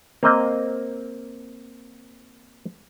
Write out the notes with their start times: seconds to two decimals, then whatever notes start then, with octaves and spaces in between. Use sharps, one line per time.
0.23 A#3 C4 D#5